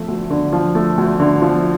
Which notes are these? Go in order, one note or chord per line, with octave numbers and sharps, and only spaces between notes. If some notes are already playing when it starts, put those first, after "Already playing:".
Already playing: F3 A3
D2
D3
F3
A3
D2
D3
F3